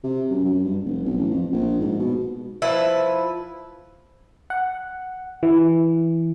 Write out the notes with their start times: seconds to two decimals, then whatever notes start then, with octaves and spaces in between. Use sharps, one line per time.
0.04 C3
0.30 F#2
0.45 F#2
0.64 G2
0.85 F1
1.05 B1
1.17 A1
1.31 F2
1.53 A#1
1.80 G#2
1.99 B2
2.62 F3 E4 B4 E5
4.50 F#5
5.43 E3